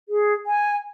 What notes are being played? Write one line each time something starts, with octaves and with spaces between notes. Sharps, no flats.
G#4
G#5